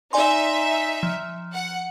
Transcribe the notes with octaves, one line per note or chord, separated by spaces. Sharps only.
D#4 D5 E5 G#5 C6
F3
F#5